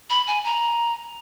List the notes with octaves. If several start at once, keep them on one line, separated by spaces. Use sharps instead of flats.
B5
G#5
A#5